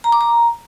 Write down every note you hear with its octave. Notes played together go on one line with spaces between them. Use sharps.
A#5
D6
A#5